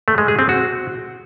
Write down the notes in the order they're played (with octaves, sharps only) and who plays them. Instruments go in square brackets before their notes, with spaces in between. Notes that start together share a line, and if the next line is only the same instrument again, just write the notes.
[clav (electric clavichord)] A3
G#3
G#4
C4
F#4